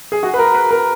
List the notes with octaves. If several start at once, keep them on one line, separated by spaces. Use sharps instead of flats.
G#4
F#4
B4
A#4
B4
A#4